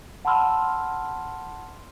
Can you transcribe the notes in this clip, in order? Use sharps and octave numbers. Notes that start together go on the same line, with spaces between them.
F#5 A5 B5 C6 E6 F6